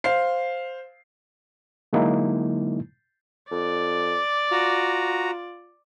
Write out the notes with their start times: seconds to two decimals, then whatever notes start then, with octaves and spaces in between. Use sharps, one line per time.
0.04 C5 F5 C7
1.93 D3 F#3 G#3 A#3 D#4 E4
3.51 F2 D5
4.52 F4 F#4 A#5